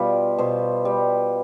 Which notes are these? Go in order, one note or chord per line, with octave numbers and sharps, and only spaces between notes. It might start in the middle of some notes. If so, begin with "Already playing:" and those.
Already playing: B2 G3 F4
B2 C5
G3